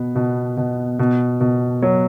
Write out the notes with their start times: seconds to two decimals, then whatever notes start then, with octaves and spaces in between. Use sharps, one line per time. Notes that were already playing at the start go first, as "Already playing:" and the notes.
Already playing: B2 B3
0.16 B2
0.57 B2
0.99 B2
1.41 B2
1.82 F#3